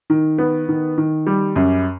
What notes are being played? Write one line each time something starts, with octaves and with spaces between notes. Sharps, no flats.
D#3
B3
D#3
D#3
G3
F#2